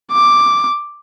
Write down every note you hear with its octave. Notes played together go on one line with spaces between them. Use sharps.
D6